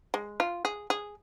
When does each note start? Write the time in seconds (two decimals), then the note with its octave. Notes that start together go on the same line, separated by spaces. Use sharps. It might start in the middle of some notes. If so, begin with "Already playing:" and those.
0.14 G#3
0.40 F4
0.65 G#4
0.90 G#4